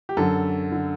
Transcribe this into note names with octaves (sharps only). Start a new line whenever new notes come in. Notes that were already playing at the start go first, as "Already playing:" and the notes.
G4
F#2 D3 A4
D3